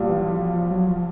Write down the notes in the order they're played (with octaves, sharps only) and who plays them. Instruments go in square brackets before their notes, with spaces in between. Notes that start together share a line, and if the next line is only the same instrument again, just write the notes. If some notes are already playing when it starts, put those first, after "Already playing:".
Already playing: [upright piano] B1 A#2 G3
[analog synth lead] E3
E3
F3
F3
F#3
F3